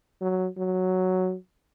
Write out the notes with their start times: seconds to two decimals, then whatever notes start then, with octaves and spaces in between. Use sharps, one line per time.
0.22 F#3
0.58 F#3